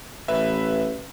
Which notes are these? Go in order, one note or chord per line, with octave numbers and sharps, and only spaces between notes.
A1 B4 E5